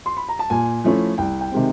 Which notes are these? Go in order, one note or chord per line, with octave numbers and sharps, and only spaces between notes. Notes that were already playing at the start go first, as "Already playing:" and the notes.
C6
B5
A#5
A5
A#2 G#5
F3 A3 C#4 E4
C2 G5
G5
C3 D#3 G#3 C4